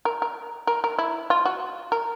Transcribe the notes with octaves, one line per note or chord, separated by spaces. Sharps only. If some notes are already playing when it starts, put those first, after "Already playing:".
A#4
A#4
A#4
A#4
E4
F4
F#4
A#4